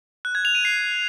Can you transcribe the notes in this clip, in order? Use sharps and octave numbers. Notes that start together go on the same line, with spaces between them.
F#6
G#6
F7
D#7
C7